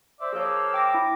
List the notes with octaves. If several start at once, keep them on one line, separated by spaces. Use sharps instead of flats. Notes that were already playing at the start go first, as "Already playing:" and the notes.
C5 D5 E5
F3 A#3 G#4 C#5 E6
G5 D6 A#6
E4